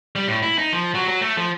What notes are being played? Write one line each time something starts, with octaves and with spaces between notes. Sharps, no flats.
G3
A2
E4
D#4
F3
F#3
F#3
A3
F3